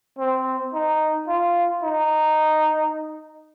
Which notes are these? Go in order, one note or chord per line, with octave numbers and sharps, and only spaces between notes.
C4
D#4
F4
D#4